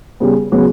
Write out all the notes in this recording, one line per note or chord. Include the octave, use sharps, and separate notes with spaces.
C#3 G3 B3
C#3 F#3 B3 F#4